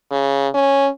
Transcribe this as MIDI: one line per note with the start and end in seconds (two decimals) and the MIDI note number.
0.11 0.48 49
0.54 0.88 61